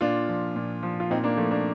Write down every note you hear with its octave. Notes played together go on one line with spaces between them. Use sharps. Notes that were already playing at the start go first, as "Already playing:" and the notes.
A#2 D4 F4
F3
A#2
F3
F4
A#2 C4 D#4
A#3 D4
F3 A3
A#3 D4